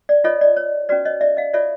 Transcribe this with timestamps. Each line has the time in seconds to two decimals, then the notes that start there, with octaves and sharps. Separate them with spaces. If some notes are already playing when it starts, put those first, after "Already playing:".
0.09 D5
0.24 F4 A4 C#5 D#5
0.41 D5
0.57 C#5
0.89 C#4 F#4 B4 D5
1.05 C#5 D#5
1.21 D5 E5
1.37 D#5 F5
1.54 F4 A4 C#5 D5 E5